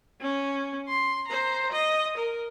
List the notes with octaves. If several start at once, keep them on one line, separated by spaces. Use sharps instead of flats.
C#4
C6
C5 A#5
D#5
A#4